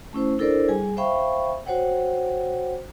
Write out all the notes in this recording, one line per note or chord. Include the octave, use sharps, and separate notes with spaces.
A3 C#4 E4 C5
D4 E4 A4 A#4 C5 D5
G3 G#4 G#5
C5 E5 F5 G5 B5 C#6
F#4 C5 C#5 F#5 G5